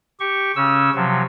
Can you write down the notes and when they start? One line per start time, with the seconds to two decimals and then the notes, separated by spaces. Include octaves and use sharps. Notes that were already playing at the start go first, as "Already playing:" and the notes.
0.20 G4 C#6
0.56 C#3 C#4 E6
0.95 C3 F3 F#3